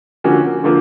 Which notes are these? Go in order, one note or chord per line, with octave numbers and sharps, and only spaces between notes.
D3 F3 A#3 C#4 F#4
D3 F3 A#3